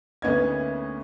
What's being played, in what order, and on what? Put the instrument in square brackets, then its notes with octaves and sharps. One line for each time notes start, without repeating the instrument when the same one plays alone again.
[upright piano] D2 A#3 B3 C#4 D#4 G#6